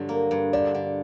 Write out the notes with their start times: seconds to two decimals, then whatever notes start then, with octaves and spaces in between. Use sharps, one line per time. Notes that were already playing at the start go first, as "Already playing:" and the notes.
Already playing: G2 D3 F#3
0.09 A#3
0.31 G2
0.53 D3 D5
0.75 D3